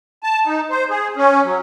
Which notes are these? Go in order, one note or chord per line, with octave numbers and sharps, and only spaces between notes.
A5
D#4
C5
G#4
C#4
F#3